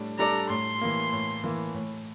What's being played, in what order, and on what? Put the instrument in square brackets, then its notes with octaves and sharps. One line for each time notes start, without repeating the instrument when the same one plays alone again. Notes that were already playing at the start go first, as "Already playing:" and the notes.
Already playing: [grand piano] A2 G3 D4 A4
[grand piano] G3 D4 A4 D5 [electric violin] A#5
[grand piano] A2 [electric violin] C6
[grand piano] E3 A#3
A2
E3 A#3
A2